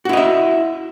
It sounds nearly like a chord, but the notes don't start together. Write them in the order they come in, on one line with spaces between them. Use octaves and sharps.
F#4 E4 D#5 E5